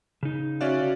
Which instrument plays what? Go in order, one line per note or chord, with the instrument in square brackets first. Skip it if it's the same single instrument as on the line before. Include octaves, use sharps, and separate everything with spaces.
[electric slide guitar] C#3 D#4
[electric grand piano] C#4 D5 F5 [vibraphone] F#4 E5